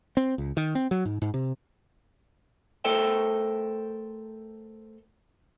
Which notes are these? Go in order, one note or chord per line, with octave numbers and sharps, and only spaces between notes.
C4
C#2
D#3
C4
F#3
G#2
G#2
C3
A3 A4 A#4 C5 E5 G5